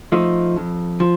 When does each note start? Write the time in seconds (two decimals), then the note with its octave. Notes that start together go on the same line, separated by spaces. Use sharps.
0.12 F3 A3 D#4
0.56 F2
1.00 F3